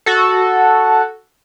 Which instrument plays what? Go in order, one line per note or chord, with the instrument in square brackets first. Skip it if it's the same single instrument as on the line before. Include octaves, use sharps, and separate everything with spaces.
[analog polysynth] F#4 A4